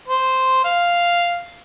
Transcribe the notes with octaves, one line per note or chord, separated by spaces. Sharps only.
C5
F5